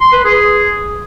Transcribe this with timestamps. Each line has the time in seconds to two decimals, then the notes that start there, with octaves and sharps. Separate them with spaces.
0.01 C6
0.13 B4
0.24 G#4